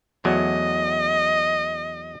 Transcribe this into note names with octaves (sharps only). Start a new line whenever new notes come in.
E2 F#3 A3 D#5